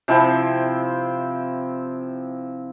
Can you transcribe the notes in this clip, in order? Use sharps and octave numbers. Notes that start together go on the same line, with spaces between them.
C3 F3 C4 E4